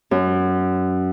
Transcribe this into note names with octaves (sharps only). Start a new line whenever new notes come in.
F#2